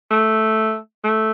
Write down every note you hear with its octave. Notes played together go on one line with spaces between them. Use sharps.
A3
A3